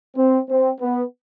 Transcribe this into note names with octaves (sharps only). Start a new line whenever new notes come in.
C4
C4
B3